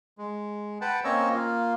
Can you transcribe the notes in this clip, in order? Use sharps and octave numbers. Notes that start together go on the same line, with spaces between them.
G#3
B4 F#5 G5 A5
A#3 C4 C#4 C#5 D#5 E6
A#3 F4